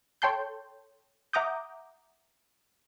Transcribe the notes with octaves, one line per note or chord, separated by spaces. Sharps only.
A4 C#5 G5 A5 C6 G6
E5 F#5 A#5 D6 D#6 G6